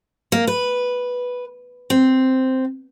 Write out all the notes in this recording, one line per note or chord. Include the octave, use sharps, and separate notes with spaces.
A#3
B4
C4